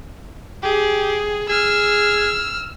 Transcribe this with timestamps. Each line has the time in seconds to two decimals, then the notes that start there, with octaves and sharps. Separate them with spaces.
0.63 G4 G#4
1.49 G#4 E6 F6